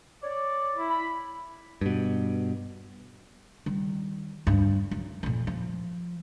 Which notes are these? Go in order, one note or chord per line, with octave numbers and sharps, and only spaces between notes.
C#5 D5
E4
B5
G2 B2
D#3 G3
D2 G2
F#2
F2 A#2
F3